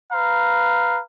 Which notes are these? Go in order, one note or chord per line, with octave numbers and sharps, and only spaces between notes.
B4 F5 A#5